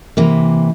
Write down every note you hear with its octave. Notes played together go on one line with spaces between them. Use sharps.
C3 E3 A#3